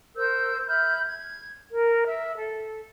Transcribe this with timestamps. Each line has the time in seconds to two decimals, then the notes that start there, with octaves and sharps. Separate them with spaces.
0.16 A#4 C5 E6 G6
0.67 E5 B5 F6 G6
1.06 G#6
1.71 A#4
2.06 E5
2.36 A4